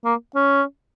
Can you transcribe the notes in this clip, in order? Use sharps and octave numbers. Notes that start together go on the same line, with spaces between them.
A#3
C#4